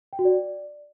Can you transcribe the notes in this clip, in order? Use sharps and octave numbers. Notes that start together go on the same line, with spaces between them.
G5
F#4
D5